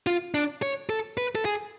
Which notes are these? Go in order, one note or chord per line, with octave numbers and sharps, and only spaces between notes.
F4
D4
C#5
A4
B4
A4
G#4